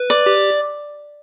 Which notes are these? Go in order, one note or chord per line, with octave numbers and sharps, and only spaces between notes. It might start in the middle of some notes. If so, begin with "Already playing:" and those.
Already playing: B4
D5
G4